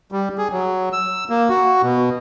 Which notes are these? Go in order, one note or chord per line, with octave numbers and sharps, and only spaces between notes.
G3
G#4
F#3
E6
A#3
F#4
B2